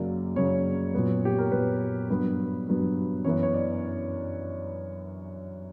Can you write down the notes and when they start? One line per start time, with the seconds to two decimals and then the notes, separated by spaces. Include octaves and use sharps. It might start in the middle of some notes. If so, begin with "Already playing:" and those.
Already playing: F#2 C#3 F#3 A#3 D5
0.36 F#2 C#3 F#3 A#3 C#5
0.94 A#2 F#3 B3
1.25 G4
1.39 A#4
1.52 A#2 F#3 B3 B4
2.09 G2 F#3 B3 B4
2.67 G2 F#3 B3
3.25 F#2 E3 B3 C#5
3.43 C#5
3.54 D5